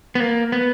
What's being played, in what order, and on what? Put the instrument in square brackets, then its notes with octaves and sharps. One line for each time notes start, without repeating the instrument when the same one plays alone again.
[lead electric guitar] B3
A#3
B3